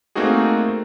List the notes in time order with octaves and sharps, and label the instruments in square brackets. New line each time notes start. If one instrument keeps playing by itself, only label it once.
[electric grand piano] A3 A#3 C4 D#4 F#4 G#4